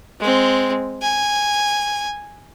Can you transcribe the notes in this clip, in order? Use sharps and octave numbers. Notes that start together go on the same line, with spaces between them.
G#3 C4
G#5